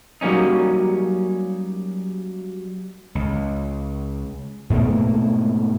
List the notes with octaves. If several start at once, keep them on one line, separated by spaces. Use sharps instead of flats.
F#3 G3 A#3 C#4 D#4
C#2
G#2 B2 A3 A#3